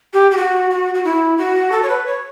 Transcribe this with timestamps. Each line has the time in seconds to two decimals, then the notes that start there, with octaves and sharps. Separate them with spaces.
0.13 G4
0.31 G4
0.37 F#4
0.70 F#4
0.94 F#4
1.05 E4
1.38 F#4
1.72 A4
1.82 C#5
1.89 B4
2.06 C#5